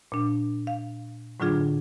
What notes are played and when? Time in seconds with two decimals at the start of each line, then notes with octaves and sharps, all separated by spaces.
0.12 A#2 D4
0.67 F5
1.40 A2 D3 F#3 D4 F4 G#4